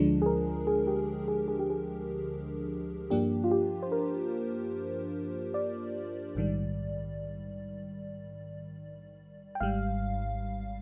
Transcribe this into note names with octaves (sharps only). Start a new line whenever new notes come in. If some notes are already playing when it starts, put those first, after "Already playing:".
Already playing: D2 D3 F3 G#3 D4
G#4
A#4
G#4
G4
G#4
G#4
G4
G#4
G2 F3 A#3 D4 G4
F4
G4
C5
A#4
D5
A#1 G#2 D#3 G3
G5
G#1 G#2 G3 F5